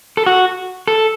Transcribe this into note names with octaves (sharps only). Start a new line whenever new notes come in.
A4
F#4
A4